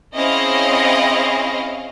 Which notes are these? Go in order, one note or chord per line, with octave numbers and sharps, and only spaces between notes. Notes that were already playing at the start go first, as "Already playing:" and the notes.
C4 C#4 E4 G#4 D#5 F5